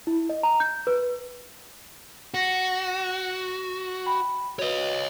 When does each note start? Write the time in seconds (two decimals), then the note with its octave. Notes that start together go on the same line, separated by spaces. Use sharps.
0.07 E4
0.30 D#5
0.43 A#5
0.60 G6
0.87 B4
2.34 F#4 A#6 C#7
4.06 G5 B5
4.59 F#4 B4 C#5 D#5